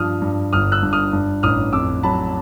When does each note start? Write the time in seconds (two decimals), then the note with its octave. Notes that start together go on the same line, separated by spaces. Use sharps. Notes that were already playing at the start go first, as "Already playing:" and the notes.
Already playing: G2 F3 D#6 F6
0.22 G2
0.53 G1 D#6 F6
0.72 E6 F#6
0.83 G2
0.93 D#6 F6
1.13 G2
1.43 A1 D#6 F6
1.73 F2 D6 E6
2.03 F#3 A5 B5